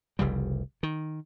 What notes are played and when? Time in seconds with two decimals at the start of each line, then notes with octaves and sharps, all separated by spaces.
0.19 F1 C2 C#3 G3
0.83 D#3